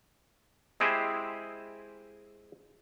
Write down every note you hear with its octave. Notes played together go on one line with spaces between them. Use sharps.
G#3 C4 E4 G4 G#4 C5